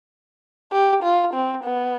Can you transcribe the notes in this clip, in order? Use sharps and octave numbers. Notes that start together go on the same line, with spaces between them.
G4
F4
C4
B3